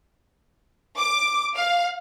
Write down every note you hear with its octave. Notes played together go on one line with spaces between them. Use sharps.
D6
F5